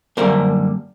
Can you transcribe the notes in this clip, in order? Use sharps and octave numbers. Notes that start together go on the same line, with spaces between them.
F#2 D3 G3 A#3 A#4 C5